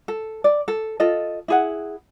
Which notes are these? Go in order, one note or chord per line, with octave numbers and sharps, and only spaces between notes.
A4
D5
A4
F4 A4 D#5
E4 G#4 F#5